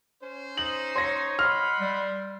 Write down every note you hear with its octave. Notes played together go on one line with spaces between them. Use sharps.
C#4 C5
D#4 F#7
C#5 C6 A#6
D#5 F#5 B5 C6 F6
G3